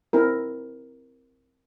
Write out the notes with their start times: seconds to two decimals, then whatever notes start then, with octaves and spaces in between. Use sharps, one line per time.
0.13 C4 E4 A#4